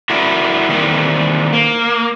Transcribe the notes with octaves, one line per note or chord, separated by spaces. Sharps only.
D4 E4 F#4 A#4 E5
D#3 E3 G3 A#3 C4
A#3